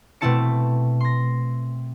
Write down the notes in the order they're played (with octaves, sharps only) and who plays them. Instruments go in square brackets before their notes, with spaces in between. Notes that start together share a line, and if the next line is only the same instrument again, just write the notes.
[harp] B2 A3 C4 E4 A5 C#7
C6 A#6